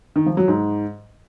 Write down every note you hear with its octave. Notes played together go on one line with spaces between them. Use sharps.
D#3
F3
F#3
G#2